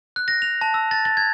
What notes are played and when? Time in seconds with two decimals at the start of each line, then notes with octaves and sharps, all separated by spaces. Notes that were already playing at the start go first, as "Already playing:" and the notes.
0.16 F#6
0.28 A#6
0.42 F7
0.61 A5
0.74 E6
0.91 A6
1.05 A6
1.17 G#6